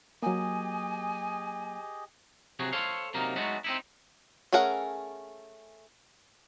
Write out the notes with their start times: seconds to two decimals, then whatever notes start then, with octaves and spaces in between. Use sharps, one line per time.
0.22 F#3 A#3 G4 G#4 D#5 G#5
2.59 C3 F#3 F#4 G#4
2.73 A4 C5 C#5 F5
3.14 C3 F#3 A#3 D#4 A#4
3.36 F#3 G#3 A3 B3 D#4 F#4
3.64 C4 D#4 E4
4.53 A3 C#4 G#4 A#4 F#5